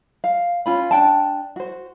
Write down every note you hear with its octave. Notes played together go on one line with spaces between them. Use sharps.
F5
C#4 F4 B5
D4 G5 A5
F#4 C5